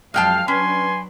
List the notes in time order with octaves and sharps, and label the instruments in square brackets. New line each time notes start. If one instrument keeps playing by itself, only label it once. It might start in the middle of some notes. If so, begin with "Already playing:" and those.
[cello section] F#2 F3 F5 [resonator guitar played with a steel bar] G#3 G5 A5 [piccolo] F6
[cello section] F#3 D4 B4 [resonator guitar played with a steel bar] C#4 [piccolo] G#5 [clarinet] C6